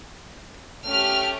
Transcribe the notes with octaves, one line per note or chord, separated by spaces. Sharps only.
A3 C#4 G4 F6